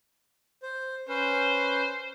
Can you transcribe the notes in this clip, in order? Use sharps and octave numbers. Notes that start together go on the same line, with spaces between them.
C5
C#4 B4 C5